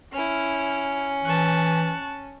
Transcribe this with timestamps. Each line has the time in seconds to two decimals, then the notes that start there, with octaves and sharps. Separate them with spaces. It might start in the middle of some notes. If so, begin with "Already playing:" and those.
0.13 C#4 E4 F6
1.25 E3 A5 C#6 F#6